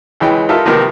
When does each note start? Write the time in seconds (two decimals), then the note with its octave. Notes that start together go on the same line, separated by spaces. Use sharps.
0.20 C#2 E3 G#3 G5
0.49 D#4 F4 G4 A4 A#4 E5
0.66 C3 D#3 F3 B3 A#4